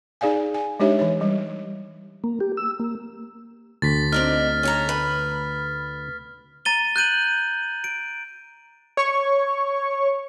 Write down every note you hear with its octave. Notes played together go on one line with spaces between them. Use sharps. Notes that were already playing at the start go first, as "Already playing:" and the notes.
D#4 G#4 D5 F5 G#5
G#5
G#3 D4 D#4 G4 C#5 E5
E3 C#5
G3
A#3
G4
E6
A#3
D2 A6 B6
C4 D4 D#4 F6
C#4 A4 A#5
B4
A#5 A6 D#7 G7
F#6 G6 D#7 F#7
D7
C#5 C#6